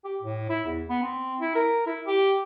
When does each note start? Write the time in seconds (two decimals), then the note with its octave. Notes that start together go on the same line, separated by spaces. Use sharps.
0.05 G4
0.22 A2
0.49 E4
0.66 E2
0.89 B3
1.03 C4
1.40 E4
1.55 A#4
1.86 E4
2.07 G4